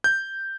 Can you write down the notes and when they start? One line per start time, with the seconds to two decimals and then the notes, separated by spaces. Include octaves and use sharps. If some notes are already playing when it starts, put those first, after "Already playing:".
0.04 G6